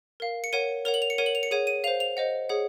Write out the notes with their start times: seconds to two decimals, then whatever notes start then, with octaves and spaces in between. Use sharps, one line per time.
0.20 A#4 F5
0.44 C#7
0.53 A#4 C#5 F#5 D#7
0.85 A#4 C#5 F#5 F7
0.94 F#7
1.02 F7
1.10 C#7
1.18 A#4 C#5 F#5 D#7
1.26 F#7
1.35 F7
1.43 C#7
1.51 G#4 C#5 F#5 D#7
1.67 D#7
1.84 F5 F7
1.87 C5
2.00 F7
2.17 C5 D#5 F#5
2.49 G#4 C#5 F#5